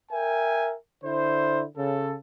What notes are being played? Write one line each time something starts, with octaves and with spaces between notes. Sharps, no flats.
A#4 E5 G5 G#5
D3 E4 C5
C#3 A4